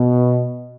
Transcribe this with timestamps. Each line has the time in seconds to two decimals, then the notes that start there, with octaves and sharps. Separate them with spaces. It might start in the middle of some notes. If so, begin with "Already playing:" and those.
Already playing: B2